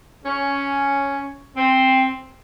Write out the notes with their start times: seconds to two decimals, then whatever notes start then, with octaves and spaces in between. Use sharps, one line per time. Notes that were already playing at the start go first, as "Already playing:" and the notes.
0.25 C#4
1.56 C4